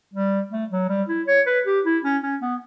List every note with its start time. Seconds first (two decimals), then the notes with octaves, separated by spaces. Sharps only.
0.14 G3
0.52 A3
0.71 F#3
0.89 G3
1.09 E4
1.27 C#5
1.46 B4
1.66 G4
1.85 E4
2.04 C#4
2.23 C#4
2.41 B3